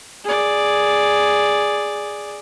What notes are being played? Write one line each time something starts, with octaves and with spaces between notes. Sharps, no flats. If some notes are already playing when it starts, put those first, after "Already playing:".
G#4 D5